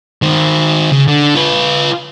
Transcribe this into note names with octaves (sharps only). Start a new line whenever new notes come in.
D#3 C5
C#3
D3
F4 B4